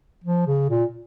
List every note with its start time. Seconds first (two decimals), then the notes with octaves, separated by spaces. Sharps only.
0.24 F3
0.47 C#3
0.70 A#2